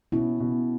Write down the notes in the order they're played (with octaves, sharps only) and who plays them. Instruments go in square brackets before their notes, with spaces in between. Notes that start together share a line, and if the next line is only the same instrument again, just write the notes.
[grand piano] B2 [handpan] C#4 E4
[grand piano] B2